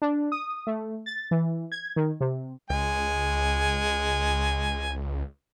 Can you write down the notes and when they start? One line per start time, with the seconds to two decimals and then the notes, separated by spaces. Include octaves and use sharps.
0.02 D4
0.32 D#6
0.67 A3
1.06 A6
1.31 E3
1.72 G#6
1.96 D#3
2.20 C3
2.70 C#2 G#3 G#5